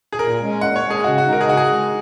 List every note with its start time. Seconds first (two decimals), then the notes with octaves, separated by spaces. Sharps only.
0.12 G#4
0.19 A#2 A#4
0.40 G#3 C#4
0.61 A#2 F#5
0.76 C#5
0.83 G#3 C#4
0.90 G#4
1.04 C#3 F#4
1.18 F#4
1.25 G#3 D#4
1.33 A#4
1.41 G#4
1.46 C#3 F#4
1.57 G#4
1.67 G#3 D#4